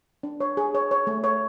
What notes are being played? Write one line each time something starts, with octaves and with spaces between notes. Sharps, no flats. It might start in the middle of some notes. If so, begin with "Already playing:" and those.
D4
C#5
G#4
C#5
C#5
A3
C#5